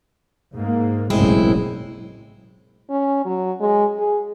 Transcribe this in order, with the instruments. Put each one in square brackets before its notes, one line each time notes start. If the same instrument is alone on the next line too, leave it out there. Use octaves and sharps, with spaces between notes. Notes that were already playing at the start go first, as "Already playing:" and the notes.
[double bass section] G#2 A#3
[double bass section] F#1 B1 A2 [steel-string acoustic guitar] G#3 C4 E4
[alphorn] C#4
F#3
G#3
G#4